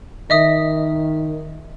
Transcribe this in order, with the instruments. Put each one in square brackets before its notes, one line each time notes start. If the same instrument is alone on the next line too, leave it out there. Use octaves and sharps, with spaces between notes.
[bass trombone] D#3 [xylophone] D#5 E5 D#6